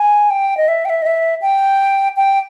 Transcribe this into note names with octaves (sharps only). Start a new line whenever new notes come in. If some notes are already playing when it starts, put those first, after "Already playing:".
Already playing: G#5
G5
D#5
E5
G5
E5
D#5
E5
G5
G5